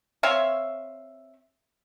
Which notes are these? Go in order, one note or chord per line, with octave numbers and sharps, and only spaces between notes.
C4 C#5 E5 F5